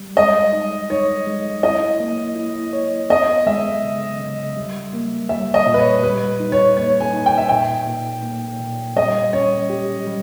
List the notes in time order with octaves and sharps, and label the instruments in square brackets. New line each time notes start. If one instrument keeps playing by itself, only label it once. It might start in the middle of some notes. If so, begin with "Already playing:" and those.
Already playing: [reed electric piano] G3
[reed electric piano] G#3 [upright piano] D#5
[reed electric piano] D#4
[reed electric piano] D#4 [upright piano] C#5
[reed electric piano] G#3
[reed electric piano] E4 [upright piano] D#5
[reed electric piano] A#3
E4
C#5
[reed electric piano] B3 [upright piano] D#5
[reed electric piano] G#3 [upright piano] E5
[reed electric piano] C#3
C#3
G3
A#3
[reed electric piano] G3 [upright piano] E5
[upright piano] D#5
[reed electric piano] A#2
[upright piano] B4
C#5
[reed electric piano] G3 [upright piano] B4
[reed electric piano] D#4
[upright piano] C#5
[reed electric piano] A#3 [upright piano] C#5
[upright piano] G#5
[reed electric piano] D#4
[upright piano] G5
E5
[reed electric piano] A#2 [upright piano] G5
[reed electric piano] A#2
A#3
A#2
[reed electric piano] G3 [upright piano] D#5
[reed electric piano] C#4 [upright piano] C#5
[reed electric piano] G4
G3